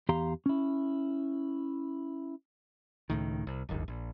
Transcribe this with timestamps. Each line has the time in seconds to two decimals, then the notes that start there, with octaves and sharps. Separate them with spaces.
0.09 E2 G4 F5 A#5 C6
0.46 C#4 E4
3.10 C#2 A2 D#3
3.47 C2
3.69 D1 G1 D#2
3.88 A#1